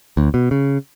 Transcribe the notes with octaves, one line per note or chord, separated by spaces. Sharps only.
D2
B2
C#3